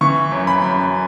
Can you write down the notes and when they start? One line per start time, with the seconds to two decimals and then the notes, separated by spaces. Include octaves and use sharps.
0.01 E3 C#6
0.32 F#2
0.47 B5
0.62 F#2